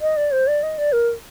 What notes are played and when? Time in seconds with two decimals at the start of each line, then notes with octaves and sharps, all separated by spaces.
0.01 D#5
0.17 D5
0.32 C5
0.47 D5
0.63 D#5
0.78 D5
0.93 A#4